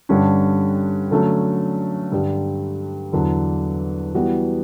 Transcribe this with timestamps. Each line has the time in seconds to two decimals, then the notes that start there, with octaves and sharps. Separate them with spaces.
0.09 G2 D3 G3 C#4
1.11 D3 F#3 A3 C#4
2.12 G2 D3 G3
3.12 E2 D3 F#3
4.14 E3 G3 B3 F#4